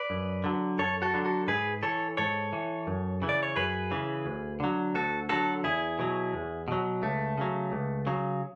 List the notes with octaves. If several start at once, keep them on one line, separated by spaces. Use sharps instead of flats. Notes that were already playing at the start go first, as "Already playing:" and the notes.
Already playing: B4 D5
F#2
D3 F#3
F#2 A4 C#5
F#4 A4
D3 F#3
F#4 A4
G#2 G#4 B4
E3 A4 C#5
G#2 A4 C#5
E3
F#2
C#3 E3
D5
C#5
F#2 G#4 B4
C#3 E3
D2
D3 F#3
D2 F#4 A4
D3 F#3 F#4 A4
E2 E4 G#4
B2 F#3
E2
B2 F#3
C#2 A3
C#3 F#3
C#2
C#3 F#3